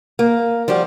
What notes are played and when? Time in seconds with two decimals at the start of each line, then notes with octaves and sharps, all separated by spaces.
0.19 A#3
0.68 F3 G3 F#4 G4